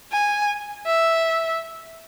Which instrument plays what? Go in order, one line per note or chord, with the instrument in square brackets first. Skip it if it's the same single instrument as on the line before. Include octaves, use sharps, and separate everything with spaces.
[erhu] G#5
E5